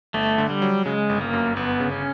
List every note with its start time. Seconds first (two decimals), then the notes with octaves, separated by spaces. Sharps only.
0.14 G1 A3
0.38 D3
0.50 G3
0.62 F#3
0.86 C#3 G#3
1.09 G1
1.21 A#3
1.34 F#2
1.57 G1 B3
1.80 C#3
1.92 C#4